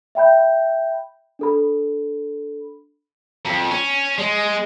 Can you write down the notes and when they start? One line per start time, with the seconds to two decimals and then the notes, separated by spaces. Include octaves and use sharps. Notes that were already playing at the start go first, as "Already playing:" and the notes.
0.15 E5 G5 B5 G6
1.39 D4 A4 B5
3.45 F2
3.71 C#4
4.18 G#3